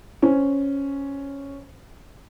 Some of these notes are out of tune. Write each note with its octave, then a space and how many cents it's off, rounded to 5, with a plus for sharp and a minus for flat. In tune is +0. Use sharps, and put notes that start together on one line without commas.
C#4 +0 C5 +0